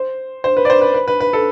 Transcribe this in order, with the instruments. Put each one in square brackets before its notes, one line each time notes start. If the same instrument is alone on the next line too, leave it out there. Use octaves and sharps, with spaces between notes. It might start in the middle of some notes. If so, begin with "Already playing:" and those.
Already playing: [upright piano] C5
C5
B4
D5
C5
B4
B4
B4
B4
A4